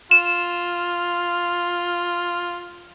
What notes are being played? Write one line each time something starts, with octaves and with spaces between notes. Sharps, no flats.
F4 E7